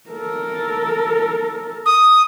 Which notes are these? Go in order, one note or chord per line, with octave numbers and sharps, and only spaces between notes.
A4 A#4
D#6